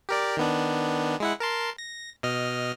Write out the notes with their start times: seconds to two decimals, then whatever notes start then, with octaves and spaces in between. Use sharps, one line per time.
0.09 G4 A#4 D5
0.37 D#3 B3 D4
1.20 G#3 E4 F#5
1.40 A#4 A5 C6
1.78 A#6
2.23 B2 D#5 F6